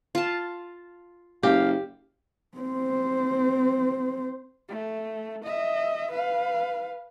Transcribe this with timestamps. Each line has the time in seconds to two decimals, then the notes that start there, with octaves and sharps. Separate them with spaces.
0.15 F4 A5
1.43 F#1 G4 F5
2.58 C4 C5
4.69 A3
5.45 D#5 E5
6.11 B4 F5